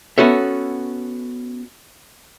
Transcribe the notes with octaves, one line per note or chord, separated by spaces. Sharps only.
B3 C#4 F#4 A4 C#5 E5